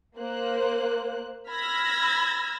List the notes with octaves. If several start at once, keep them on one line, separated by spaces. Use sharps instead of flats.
A#3 C5 F#6
B5 E6 F6 G#6 A#6